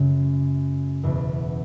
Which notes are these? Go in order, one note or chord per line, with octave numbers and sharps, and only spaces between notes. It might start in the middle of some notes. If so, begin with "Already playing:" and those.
Already playing: F#2 C#3 A3
F#1 E2 B2